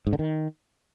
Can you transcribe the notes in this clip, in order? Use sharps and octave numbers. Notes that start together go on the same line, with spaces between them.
G#2
D3
D#3